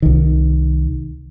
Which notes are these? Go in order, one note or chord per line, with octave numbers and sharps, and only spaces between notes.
C2 D#3